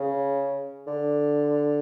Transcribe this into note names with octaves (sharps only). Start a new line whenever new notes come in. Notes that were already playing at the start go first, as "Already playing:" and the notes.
Already playing: C#3
D3